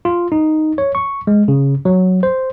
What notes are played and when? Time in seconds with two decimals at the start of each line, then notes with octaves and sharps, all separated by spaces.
0.05 F4
0.32 D#4
0.78 C#5
0.95 C#6
1.27 G#3
1.48 C#3
1.85 F#3
2.23 C5